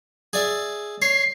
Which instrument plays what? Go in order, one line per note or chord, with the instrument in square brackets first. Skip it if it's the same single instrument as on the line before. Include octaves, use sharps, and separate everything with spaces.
[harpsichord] G#4 D5 E5
[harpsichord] C#5 [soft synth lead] C7